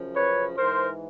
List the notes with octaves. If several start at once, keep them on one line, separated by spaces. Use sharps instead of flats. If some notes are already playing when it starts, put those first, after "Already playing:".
Already playing: F#2 C#3 F3
B4 C#5
G#2 E3 A#4 C5